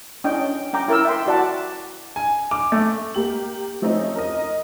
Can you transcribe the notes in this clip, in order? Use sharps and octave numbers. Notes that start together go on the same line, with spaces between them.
C#4 D4 E4 D#5 G5
C#4 G5 A#5 D6
E4 A#4 D6 E6
E5 G5 C6
E4 F#4 D5 E5 F#5 A5
G#5
D6
A3
A#3 G4 F#7
F3 A3 C4 C#4 D#4
A#4 D#5